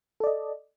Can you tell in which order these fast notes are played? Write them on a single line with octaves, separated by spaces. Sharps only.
A4 D5 D#5